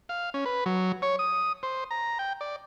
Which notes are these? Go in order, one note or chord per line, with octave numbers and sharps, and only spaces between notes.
F5
C#4
B4
F#3
C#5
D#6
C5
A#5
G5
D5